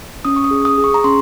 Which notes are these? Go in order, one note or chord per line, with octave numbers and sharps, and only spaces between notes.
C#4 D#6
C#6
D#6
G#4
D#6
G#4
C#6
A#5
C#4 C6